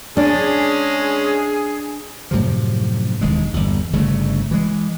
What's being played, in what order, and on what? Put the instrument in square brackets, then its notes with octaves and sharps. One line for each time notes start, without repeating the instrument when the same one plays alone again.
[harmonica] G#3 C#4 [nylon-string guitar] D4 [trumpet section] G#4
[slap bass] F#2 A2 C3 F3
E1 D#2 G#3
G1 E2
G1 C#3 A3
E3 G#3